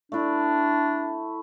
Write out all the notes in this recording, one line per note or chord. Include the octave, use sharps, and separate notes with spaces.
A3 D4 E4